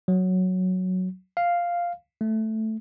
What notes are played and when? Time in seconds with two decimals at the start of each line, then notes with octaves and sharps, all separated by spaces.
0.08 F#3
1.37 F5
2.21 A3